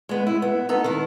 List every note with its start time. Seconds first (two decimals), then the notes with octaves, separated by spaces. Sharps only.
0.09 G#3 B3
0.27 E4
0.42 B3
0.69 B3 D#4 A4
0.84 D#3 E4